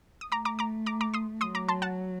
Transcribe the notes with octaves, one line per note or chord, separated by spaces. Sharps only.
D#6
A3 A#5 D6
A#5 D6
A#5 D6
A#5 D6
A#5 D6
C6 D#6
F#3 C6 D#6
A#5 D6
A5 C6
F#5 A5